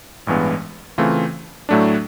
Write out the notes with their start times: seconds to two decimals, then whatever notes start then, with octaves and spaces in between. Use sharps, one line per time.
0.27 A1 G2 E3 G#3 B3
0.98 C#3 E3 A3 C4 F4
1.69 A2 F#3 A3 D4